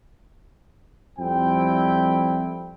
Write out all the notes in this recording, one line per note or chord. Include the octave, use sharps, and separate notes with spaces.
F2 G3 C4 E4 G5